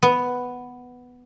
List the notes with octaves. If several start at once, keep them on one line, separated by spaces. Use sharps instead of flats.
B3